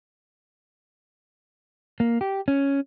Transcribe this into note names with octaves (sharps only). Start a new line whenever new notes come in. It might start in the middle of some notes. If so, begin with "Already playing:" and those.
A#3
G4
C#4